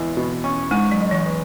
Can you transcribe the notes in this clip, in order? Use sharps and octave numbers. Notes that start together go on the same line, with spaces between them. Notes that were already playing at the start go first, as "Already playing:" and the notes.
Already playing: E2 G#3
B2
C#4
G#2 G#3
F#3
G#3
E3
B3